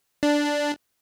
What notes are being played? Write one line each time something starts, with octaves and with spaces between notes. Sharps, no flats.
D4